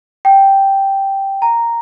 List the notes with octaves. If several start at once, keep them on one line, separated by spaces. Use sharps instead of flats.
G5
A#5